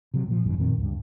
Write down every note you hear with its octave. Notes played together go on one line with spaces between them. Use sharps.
C3 F#3
A#2 F3
G#1 F#2 D#3
F2 A#2 D#3 C4
C#2 G2